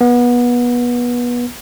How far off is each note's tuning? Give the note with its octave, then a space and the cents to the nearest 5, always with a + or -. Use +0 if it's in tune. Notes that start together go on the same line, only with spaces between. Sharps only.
B3 -25